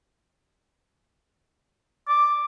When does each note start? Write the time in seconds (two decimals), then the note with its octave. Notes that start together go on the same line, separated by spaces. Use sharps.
2.08 D6